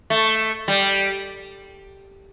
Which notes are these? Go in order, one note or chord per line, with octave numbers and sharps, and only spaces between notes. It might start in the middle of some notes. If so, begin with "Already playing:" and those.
A3
G3